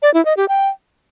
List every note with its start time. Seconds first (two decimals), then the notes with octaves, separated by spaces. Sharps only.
0.02 D5
0.14 E4
0.25 D#5
0.37 G4
0.48 G5